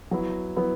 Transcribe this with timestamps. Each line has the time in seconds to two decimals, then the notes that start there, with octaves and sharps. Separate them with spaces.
0.11 F#3 B3 E4
0.56 F#3 B3 E4